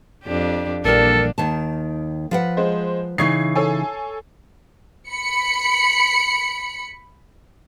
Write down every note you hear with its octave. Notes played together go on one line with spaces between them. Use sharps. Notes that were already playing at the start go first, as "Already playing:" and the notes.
F2 D4 G4
A#1 E3 G3 A#3 D4 A4 A#4
D#2 D#3 A5
F3 B4 F#5
G#3 C5
C#3 E3 D#4 C#6 G#6 C7
A4 C#5 G#5
B5 C#7